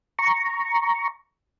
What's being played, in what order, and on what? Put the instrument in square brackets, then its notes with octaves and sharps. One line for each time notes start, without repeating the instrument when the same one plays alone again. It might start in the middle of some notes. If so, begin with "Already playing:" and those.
[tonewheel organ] A#5 C#6